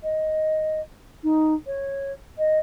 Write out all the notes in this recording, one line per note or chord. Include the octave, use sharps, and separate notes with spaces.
D#5
D#4
C#5
D#5